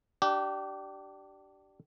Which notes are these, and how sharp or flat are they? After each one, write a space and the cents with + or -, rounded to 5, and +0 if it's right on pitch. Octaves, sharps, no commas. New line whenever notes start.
D4 +5 G4 -25